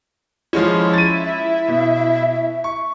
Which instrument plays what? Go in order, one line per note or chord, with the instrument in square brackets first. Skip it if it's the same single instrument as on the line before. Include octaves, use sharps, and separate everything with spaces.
[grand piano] F3 G#3 C#4 [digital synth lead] E4
[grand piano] A6 D#7
[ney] E5
[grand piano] B2
C#6